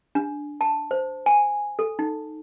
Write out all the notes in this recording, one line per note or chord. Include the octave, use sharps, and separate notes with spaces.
D4
A5
C5
G#5
A4
D#4